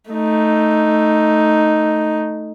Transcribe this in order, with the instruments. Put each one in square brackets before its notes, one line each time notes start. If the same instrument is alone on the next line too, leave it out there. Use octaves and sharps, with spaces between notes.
[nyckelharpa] A3 D#4